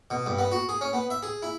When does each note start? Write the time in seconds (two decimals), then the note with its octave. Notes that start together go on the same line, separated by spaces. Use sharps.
0.11 B2
0.26 G2
0.39 B3
0.52 F#4
0.69 G#4
0.81 C#4
0.93 B3
1.10 E5
1.23 G#4
1.42 E4